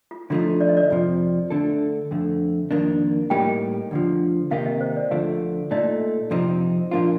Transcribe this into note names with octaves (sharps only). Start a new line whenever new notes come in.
F4
D3 F3 A3 D#4 F4
D5
D#5
D5
F2 C3 F3
D3 A3 D4 A4
F2 D3 A3
F2 D#3 A#3 D4
A2 G3 A#3 D#4 G4 G5
D2 D3 F3
C3 D#3 A#3 D#4 G4 F5
D#5
C5
D5
D2 D3 F3 A3 D4 F5
A#2 A3 D#4 A4 D5
F2 C3 F3 C4 D#4
A#2 F3 A#3 D4 F4